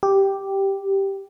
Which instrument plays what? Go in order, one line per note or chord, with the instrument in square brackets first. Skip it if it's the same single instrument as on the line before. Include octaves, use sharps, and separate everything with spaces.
[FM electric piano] G4